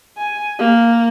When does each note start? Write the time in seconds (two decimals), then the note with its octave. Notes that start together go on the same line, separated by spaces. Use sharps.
0.18 G#5
0.59 A#3